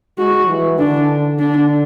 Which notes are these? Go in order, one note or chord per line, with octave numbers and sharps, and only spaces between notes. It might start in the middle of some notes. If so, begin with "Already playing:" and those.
G#3 F#4
E3
D3 D4
D3 D4